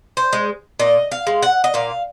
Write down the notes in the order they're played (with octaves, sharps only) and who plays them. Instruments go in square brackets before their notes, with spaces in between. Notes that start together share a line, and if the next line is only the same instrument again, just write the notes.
[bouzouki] C5
G#3
A#2 D#5
F5
G#3
F#5
D#5
A#2 F5